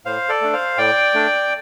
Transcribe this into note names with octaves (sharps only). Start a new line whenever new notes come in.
A2 C5 F5
A4 D5
A3 D4
C5 F5
A2 D5 G5
A3 D4